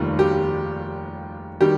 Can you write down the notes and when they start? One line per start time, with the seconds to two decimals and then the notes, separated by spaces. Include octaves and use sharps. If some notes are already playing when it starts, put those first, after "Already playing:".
Already playing: F1 D#2 D#3 G3 F4
0.19 G4
1.61 D#3 G3 G4